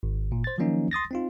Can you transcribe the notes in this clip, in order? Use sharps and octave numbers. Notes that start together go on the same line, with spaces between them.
G#1
G1 A#2
C5 A6
D#3 F3 F#3 A#3 C#4 D#4
C6 D#6 A6 A#6
C4 D#4 F4